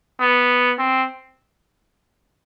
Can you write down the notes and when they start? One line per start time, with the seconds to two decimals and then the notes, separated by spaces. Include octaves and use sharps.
0.20 B3
0.78 C4